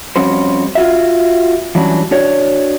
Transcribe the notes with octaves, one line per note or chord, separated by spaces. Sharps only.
F2 G3 C#4 F#4 C5
F4 F#4 E5
E3 F#3 G3 C#4 D4
D4 F#4 C#5 D5